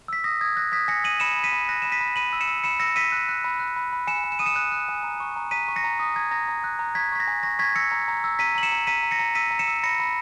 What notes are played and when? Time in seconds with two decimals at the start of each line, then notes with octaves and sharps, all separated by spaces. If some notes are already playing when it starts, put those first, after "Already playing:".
0.08 E6 B6
0.24 D#6 A#6
0.41 D#6 G#6
0.56 F#6 A#6
0.72 D#6 G#6 B6
0.88 G#5 A#6 C#7
1.04 D#6 D#7 F#7
1.20 B5 C#7 E7
1.37 B5
1.44 B6 D#7
1.52 B5
1.69 F#6 A#6
1.82 B5 E7
1.92 B6 D#7
2.01 B5
2.16 B5 D#7 F#7
2.33 E6
2.41 C#7 E7
2.48 E6
2.64 B5 C#7 E7
2.80 E6 A#6 C#7
2.96 E6 B6 D#7
3.12 F#6
3.29 F#6
3.44 B5
3.60 F#6
3.76 B5
3.93 B5
4.07 G#5 C#7 E7
4.24 G#5
4.32 E7
4.39 D#6 D#7
4.46 C#7 E7
4.56 F#6
4.72 F#6
4.89 G#5
5.03 A#5
5.20 C#6
5.36 A#5
5.51 A#5 B6 D#7
5.68 C#6
5.76 A#6 C#7
5.84 A#5
6.00 D#6
6.16 A#5 G#6
6.31 A#5 A#6
6.48 A#5
6.64 F#6
6.79 A#5
6.95 C#6 G#6 B6
7.12 C#6 B6
7.20 A#6
7.28 G#5
7.43 C#6 A#6
7.59 C#6 G#6 B6
7.75 E6 A#6 C#7
7.92 A#5
8.08 A#5
8.24 E6
8.39 A#5 B6 D#7
8.55 A#5 F#7
8.63 C#7 E7
8.72 A#5
8.87 A#5 B6 D#7
9.03 A#5
9.11 A#6 C#7
9.19 A#5
9.35 E6 B6 D#7
9.51 A#5
9.59 C#7 E7
9.68 E6
9.83 B5 A#6 C#7
10.00 B5